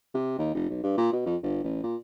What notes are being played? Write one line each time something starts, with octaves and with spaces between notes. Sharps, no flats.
C3
D#2
F1
B1
G2
A#2
B2
F2
G1
A1
A#2